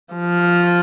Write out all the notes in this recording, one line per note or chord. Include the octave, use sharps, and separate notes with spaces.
F3